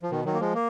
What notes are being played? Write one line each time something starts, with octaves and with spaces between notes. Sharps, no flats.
F3
B2 D#3
D#3 F#3
A#3
F3 G#3
A#3